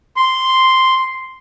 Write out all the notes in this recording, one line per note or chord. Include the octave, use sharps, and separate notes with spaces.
C6